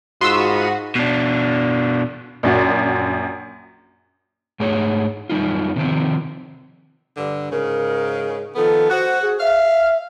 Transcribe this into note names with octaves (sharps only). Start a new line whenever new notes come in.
G#2 F4 F#4 B5 C6 D#6 E6
B2 D4
A#1 F#2 F#4
G#2 A3 G#4 C#5
F#2 G3 D#4 F4
C3 D#3 F3 C4
G2 D3
G#2 C#3 A#4
D#3 F3 B3 A4
F#4 C5
G#4
E5 F5